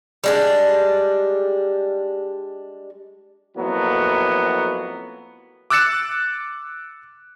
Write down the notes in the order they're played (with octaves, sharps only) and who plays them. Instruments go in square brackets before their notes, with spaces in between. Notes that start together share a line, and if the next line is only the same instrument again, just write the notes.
[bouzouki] G3 G#3 D4
[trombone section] F2 A2 F#3 A#3 B3
[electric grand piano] D6 E6 F#6 A6 C#7 E7